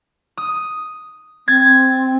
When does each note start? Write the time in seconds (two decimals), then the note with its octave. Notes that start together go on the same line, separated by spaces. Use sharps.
0.37 D#6
1.48 C4 G#6 A6